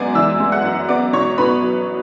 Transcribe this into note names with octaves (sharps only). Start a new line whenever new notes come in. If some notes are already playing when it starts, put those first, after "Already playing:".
Already playing: F#2 G#3 B3 G#4 D5 G#5 D6
E3 E5 E6
G#3
F#5 F#6
F#2
B3 D5 D6
B2 C#5 C#6
B2 B4 B5
F#3